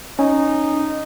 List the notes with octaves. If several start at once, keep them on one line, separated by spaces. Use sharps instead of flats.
C#4 D#4